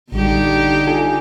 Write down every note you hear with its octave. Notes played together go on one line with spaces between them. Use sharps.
A1 D3 G3 D#4 G4
F4 A4 G#5